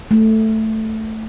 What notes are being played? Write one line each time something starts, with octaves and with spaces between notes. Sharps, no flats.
A3